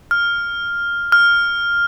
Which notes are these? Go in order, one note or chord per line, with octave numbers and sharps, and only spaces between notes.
F6
F6